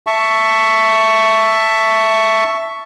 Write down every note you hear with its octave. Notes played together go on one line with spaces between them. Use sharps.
E5 A5 C#6